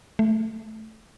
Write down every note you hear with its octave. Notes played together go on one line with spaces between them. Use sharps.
A3